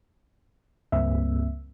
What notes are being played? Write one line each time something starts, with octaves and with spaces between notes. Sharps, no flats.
C#2 G2 A#3 C4 E5